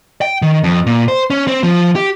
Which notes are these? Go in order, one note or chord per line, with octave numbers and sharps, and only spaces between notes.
G5
D#3
F2
A#2
C5
C#4
C4
F3
G4